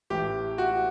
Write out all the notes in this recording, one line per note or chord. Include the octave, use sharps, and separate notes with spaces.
A1 A2 E3 G4
F#4